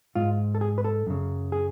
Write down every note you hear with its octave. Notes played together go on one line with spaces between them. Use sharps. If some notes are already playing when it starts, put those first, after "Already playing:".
G#2 F4
A4
G#4
B4
A4
F#2 C#3
G#4